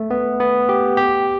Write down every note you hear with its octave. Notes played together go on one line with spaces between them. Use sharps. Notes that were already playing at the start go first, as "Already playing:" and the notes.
Already playing: A3
B3
B3
G4
G4